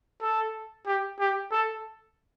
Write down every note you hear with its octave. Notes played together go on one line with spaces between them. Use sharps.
A4
G4
G4
A4